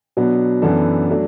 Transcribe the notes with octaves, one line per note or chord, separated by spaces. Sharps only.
B2 F#3 B3 D4
F#2 E3 B3 D4 A4
F#3 A3 D4